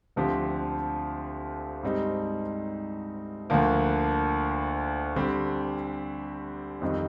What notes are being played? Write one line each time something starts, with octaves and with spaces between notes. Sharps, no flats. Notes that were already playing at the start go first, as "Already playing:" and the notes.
D2 D3 F3 C4 G4
G#2 G3 C4 D#4
D2 D3 F3 A#3
D3 G3 C4 G4
F2 D#3 G3 C4 D#4